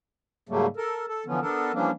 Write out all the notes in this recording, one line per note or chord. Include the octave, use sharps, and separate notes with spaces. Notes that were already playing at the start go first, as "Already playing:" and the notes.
G#2 C#3 F#3 G3 A3 A#3
A4 A#4
A4
D3 E3 F3 B3 C#4
B3 D4 A4 A#4
E3 F3 G3 A#3 C#4 D4